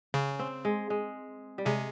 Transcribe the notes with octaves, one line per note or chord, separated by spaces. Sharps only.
C#3 C#4
C4
G#3
G#3
G3
C3 G#3